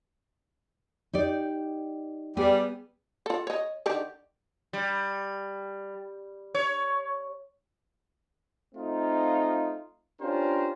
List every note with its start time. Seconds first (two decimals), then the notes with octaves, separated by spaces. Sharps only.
1.13 D#4 G4 D5
2.37 G3 B3 G#4
3.26 F4 A4
3.47 C#5 D#5
3.86 D3 D#3 G4
4.73 G3
6.55 C#5
8.75 A3 C4 D#4 F4
10.21 C#4 D4 F4 G4 A#4 C5